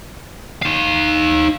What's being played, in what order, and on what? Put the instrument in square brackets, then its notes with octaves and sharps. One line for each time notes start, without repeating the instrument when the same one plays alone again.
[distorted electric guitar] D#4 F5